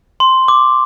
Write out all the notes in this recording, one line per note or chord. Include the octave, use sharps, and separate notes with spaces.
C6
D6